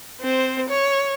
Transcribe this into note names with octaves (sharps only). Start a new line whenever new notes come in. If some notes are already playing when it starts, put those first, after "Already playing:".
C4 C5
C#5